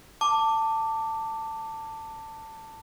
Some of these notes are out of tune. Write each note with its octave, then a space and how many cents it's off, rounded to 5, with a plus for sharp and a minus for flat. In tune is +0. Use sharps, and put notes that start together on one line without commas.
A5 +20 D6 +0